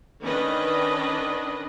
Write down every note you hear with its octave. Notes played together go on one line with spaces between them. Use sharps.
D#3 C#4 D4 B4 D#5